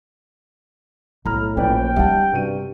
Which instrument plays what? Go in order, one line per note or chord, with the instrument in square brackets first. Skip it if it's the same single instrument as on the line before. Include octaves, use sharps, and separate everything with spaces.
[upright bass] B1 [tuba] A2 [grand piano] A#5 B5 F6
[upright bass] A#1 [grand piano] C#4 B4 D5 [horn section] G5
[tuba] G3 [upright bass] C#4 D#4 [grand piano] E5 F#5 A5
[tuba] G2 [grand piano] C3 F#4 D#7